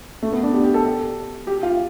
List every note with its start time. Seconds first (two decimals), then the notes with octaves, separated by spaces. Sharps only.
0.23 A3
0.32 B3
0.43 D4
0.53 G4
0.64 G4
0.74 A4
1.47 G4
1.63 F4